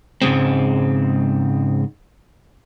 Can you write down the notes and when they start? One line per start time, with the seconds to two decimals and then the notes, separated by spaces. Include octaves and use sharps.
0.22 G#2 C#3 G#3 C4